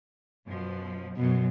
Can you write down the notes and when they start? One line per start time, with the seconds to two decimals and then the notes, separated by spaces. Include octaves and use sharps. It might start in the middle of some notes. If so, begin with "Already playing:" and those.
0.48 F#2 B2 F3
1.17 F#2 B2 F#3